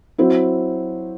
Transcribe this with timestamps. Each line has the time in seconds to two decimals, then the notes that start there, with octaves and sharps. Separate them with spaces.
0.18 F#3 C4 E4